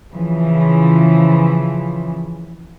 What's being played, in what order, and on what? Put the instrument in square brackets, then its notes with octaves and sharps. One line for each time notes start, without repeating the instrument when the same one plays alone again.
[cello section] C#3 E3 F3